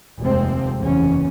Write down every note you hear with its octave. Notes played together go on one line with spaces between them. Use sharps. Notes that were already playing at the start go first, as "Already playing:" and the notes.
F1 D#2 C3 F3 G#3 C4
F#1 E2 C#4